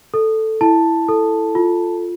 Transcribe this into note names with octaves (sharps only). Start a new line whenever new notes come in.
A4
E4 A5
A4
F4